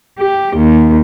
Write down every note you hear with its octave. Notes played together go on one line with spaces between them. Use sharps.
G4
D#2